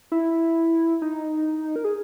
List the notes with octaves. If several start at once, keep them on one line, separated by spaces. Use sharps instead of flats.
E4
D#4
A#4
G#4